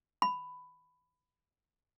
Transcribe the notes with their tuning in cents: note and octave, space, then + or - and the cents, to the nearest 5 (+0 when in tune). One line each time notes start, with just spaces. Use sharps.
B5 +10